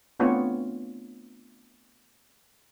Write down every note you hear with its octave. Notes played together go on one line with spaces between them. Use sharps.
A3 B3 C4 D4 F4 C#5